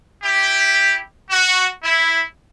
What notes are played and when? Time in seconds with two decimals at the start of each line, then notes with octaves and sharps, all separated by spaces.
0.23 E4 G4
1.31 F#4
1.84 E4